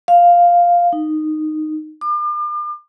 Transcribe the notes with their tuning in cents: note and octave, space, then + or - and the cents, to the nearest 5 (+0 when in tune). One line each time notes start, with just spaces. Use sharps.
F5 +0
D#4 -10
D6 +40